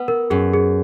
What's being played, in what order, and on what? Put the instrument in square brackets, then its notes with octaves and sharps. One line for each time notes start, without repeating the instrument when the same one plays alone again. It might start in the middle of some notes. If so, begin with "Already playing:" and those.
Already playing: [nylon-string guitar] B3 [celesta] B4
[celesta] A#4
[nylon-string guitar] F#2 [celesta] G#4
[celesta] G#4